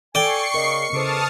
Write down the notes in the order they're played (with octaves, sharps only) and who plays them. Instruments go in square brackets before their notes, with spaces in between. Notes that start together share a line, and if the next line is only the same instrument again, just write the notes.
[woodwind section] A4 G#5 [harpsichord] D5 G5 [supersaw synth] C#6 C7 C#7
[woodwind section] C#3 [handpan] A#4 D#5
[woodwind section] E2 A4 D6 [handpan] C#3 C5 [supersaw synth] A5 D#6 F6